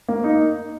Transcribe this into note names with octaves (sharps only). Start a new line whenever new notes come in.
A#3
D#4